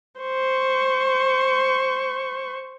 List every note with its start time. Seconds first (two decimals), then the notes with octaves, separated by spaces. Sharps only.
0.21 C5 C#6